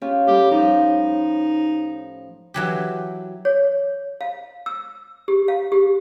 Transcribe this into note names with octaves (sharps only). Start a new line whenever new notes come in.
C#4 F4 G4
A2 G3 G4
F3 D#4
E3 F#3 G4
C#5
F5
E6
G4
F5
G4